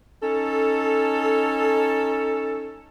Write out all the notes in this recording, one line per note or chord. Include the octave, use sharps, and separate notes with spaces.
C#4 D#4 A4